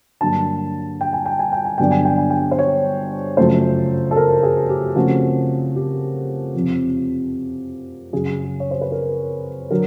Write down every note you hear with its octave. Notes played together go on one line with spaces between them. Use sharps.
G2 D3 F#3 A#3 D4 A5
G5
G#5
G5
G#5
G5
G#5
G2 D3 F#3 B3 D4 G5
G#5
G5
G#5
G5
C5
C#5
F#2 C#3 F3 A3 C5
A4
A#4
G#4
G4
C#3 F3 A3 C4 F#4
G4
F2 C3 F3
F#2 C#3 F#3 G#4
C#5
C5
B4
A#4
D3 F#3 A#4